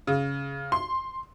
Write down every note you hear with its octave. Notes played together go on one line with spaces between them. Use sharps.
C#3
C6